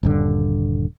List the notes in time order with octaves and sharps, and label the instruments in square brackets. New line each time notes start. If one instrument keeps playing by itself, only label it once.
[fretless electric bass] D#1 G2 D3